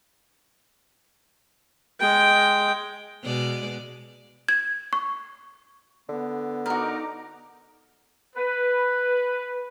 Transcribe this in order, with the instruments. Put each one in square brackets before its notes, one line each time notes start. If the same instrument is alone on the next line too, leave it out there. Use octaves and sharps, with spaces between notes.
[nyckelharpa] G#3 G5
[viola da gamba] B2 G#3 D5
[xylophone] G#6
C#6
[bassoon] D3 [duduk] B3
[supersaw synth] D#4 A#5 D6 [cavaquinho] F#4 A#4
[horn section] B4